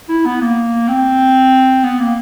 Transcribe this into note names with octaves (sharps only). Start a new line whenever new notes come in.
E4
B3
A#3
C4
B3
A#3